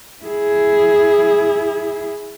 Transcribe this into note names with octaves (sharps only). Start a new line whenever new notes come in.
E4 G#4